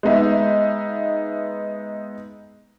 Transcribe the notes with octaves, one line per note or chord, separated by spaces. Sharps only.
G#3 B3 D#4 E5